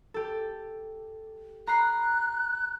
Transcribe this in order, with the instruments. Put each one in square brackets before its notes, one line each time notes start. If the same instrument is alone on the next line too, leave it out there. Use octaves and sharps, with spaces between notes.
[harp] G4 A4
[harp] A#5 B5 C7 [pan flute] F#6